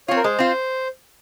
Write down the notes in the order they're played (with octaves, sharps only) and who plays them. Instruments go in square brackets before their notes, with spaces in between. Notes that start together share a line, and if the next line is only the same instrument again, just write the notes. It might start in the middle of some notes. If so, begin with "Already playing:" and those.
[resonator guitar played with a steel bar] C4 F4 [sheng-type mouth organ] C#5
[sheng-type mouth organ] A#4
[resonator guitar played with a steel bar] G#3 [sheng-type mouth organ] C5
[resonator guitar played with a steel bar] C4 F4